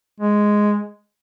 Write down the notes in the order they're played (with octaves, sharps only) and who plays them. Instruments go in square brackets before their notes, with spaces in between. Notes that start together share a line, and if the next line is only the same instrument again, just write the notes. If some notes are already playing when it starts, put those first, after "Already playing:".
[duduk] G#3